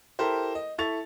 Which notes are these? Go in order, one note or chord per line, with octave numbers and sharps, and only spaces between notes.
E4 G4 A4 A#4 C5
D#5
E4 A4 C#6 A6 F7